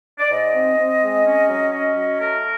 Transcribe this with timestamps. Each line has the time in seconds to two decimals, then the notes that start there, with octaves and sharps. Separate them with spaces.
0.19 D5
0.30 G#2 D#5
0.54 C4
0.78 C4
1.02 G#3
1.25 C#4
1.48 F#3
1.72 C#4
1.95 F#3
2.19 A3 A#4